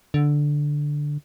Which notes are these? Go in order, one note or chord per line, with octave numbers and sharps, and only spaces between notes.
D3